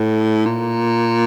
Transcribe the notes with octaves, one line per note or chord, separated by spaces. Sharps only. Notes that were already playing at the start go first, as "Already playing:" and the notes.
Already playing: A2
A#2